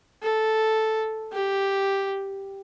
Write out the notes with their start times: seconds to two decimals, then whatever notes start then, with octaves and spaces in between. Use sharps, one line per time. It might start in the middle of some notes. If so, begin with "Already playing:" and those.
0.23 A4
1.32 G4